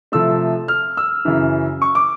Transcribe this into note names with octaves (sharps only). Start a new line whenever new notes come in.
C3 F3 A3 E6
F6
E6
F#2 C#3 E3
C#6
D6